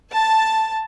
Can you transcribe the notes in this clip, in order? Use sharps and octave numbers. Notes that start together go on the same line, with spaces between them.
A5